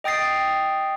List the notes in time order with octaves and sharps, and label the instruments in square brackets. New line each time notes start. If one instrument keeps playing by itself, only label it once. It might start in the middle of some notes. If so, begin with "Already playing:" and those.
[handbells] D#5 G5 D#6 A6 C7